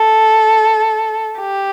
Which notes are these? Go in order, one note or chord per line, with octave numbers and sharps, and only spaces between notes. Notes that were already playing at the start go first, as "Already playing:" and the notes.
Already playing: A4
G4